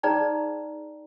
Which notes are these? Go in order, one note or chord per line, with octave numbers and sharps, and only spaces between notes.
D#4 G#4 C5 D5 G5 A#5